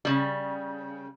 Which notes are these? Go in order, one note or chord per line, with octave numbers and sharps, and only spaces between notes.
C#3 G3